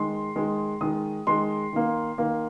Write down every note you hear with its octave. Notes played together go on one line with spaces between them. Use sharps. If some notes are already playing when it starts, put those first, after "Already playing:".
Already playing: D#3 G#3 C6
D#3 G#3
D#3 G#3 D#6
D#3 G#3 C6
D#3 A#3
D#3 A#3